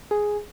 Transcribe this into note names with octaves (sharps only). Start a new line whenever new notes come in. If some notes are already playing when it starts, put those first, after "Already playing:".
G#4